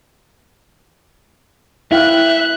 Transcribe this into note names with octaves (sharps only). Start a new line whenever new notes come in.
E4 E5 F5 G5 F#6